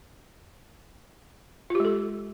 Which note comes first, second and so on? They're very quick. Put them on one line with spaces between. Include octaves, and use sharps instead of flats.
F4 G4 G#3 A4